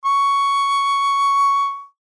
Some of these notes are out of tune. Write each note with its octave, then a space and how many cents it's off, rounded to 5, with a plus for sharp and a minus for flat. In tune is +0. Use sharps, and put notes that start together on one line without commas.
C#6 +10